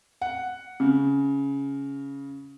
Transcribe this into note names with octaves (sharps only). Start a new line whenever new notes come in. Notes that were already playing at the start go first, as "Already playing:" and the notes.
F#5
C#3